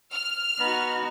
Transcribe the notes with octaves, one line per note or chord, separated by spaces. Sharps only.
F6
B3 D#4 F#4